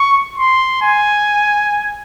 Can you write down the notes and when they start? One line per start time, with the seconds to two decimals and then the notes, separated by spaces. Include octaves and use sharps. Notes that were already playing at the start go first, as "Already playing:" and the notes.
Already playing: C#6
0.38 C6
0.82 G#5